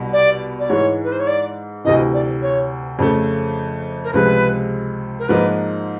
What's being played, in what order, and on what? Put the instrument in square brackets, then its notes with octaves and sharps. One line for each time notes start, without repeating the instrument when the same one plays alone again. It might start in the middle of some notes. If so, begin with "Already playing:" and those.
Already playing: [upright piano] C2 B2 G3
[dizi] D5
D5
[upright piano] G#2 E3 G#3 [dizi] C#5
[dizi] B4
C5
C#5
D5
[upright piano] D2 C3 E3 [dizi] D#5
[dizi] D5
C#5
[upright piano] F2 C#3 F3 A3
[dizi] A#4
[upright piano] C#2 C3 F3 G#3 [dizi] B4
[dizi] A#4
[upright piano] G#2 F3 A#3 D#4 [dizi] B4